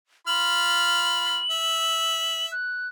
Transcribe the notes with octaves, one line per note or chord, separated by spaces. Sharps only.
F4 B5 F6 F#7
E5
F#6